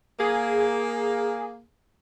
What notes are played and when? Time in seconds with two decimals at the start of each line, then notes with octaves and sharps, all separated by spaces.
0.20 A#3 G#4